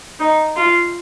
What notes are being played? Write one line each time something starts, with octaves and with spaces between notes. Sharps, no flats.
D#4
F4